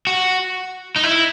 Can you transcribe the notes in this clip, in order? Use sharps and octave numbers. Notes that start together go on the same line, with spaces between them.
F#4
D#4
E4